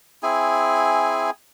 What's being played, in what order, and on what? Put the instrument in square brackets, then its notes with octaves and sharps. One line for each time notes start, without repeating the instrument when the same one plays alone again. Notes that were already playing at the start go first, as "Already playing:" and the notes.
[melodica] C4 E4 G#4 G#5